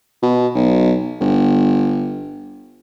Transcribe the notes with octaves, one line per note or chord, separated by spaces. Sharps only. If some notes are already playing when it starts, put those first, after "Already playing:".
B2
B1
G1